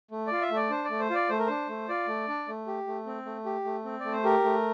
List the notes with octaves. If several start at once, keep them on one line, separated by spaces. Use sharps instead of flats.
A3
F4 D5
E5
A3 D5
D4 C5
A3 D5
C5
F4 D5
A3 C5
A#4
D4 C5
A3
F4 D5
A3
D4
A3
G4
A3
C4
A3
G4
A3
C4
A3 D5
C5
G4 A#4
A3